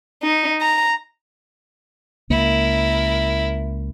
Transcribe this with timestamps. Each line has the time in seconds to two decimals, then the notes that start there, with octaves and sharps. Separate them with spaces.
0.23 D#4
0.61 A#5
2.30 C#2 A#3 E4 A#4